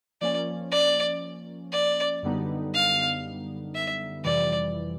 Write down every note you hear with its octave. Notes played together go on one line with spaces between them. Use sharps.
F3 A#3 C#4 D5
D5
D5
F#2 D3 G3 B3 D#4
F5
E5
F2 C3 E3 G3 D5